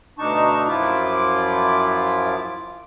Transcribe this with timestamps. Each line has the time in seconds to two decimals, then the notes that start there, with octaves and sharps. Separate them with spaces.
0.18 D2 B2 D4 D#4 A5 C#6
0.68 F#2 F3 E4 F4 D6